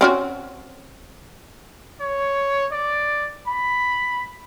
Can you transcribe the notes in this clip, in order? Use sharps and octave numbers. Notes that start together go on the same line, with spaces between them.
C4 C#4 F#4
C#5
D5
B5